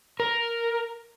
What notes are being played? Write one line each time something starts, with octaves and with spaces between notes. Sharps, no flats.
A#4